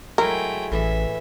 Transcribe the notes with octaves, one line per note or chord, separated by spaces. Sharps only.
F#3 G#3 A3 E4 A#4 G5
A1 A2 E3 E5